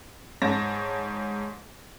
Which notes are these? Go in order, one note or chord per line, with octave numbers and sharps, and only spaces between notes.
G#2 C#5 A5 A#6